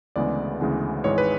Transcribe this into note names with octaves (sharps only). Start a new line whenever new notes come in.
D2 C#3 E3 G#3 B3 D5
D2 C#3 E3 G#3 B3
G#1 G#2 E3 G#3 C#5
B4